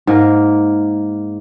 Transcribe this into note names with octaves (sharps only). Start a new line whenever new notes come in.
G#2 A#3 A#4